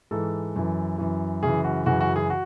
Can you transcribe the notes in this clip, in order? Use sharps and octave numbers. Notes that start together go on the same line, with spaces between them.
G#2 E3 A4
F#2 E3
F#2 E3
F#2 C#3 E3 G#4
F#4
F#2 C#3 E3 F#4
F#4
G#4
F#4